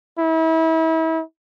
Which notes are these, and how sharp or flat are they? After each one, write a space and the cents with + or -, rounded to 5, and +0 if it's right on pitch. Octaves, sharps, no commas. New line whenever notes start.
E4 -35